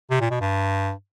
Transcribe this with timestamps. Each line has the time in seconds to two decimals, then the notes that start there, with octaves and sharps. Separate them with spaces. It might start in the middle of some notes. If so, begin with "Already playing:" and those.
0.11 C3
0.21 A#2
0.31 B2
0.40 G2